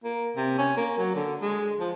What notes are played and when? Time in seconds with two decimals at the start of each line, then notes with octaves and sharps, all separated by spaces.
0.04 A#3
0.37 C3
0.58 C#4
0.77 A#3
0.98 F#3
1.15 D3
1.42 G#3
1.80 F3